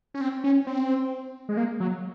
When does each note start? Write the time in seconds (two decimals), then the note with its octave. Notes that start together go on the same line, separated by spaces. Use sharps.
0.14 C#4
0.21 C4
0.44 C#4
0.67 C4
1.49 G#3
1.57 A#3
1.80 F#3